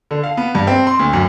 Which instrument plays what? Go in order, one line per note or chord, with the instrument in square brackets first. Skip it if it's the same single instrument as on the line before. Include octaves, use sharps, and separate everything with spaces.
[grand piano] D3
F5
B3
G2
C4
C6
D2
F#2